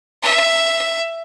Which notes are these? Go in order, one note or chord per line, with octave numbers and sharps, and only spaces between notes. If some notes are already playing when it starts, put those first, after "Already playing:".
E5